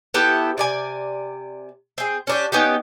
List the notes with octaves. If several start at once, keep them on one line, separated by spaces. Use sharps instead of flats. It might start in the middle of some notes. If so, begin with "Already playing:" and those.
B3 E4 G4 A4
C3 D5 G#5
C4 G#4
C#4 D4 G4
B3 C#4 D#4 G4